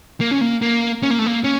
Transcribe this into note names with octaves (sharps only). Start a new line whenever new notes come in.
A#3
C#4
A#3
A#3
C#4
A#3
A3
A#3
C#4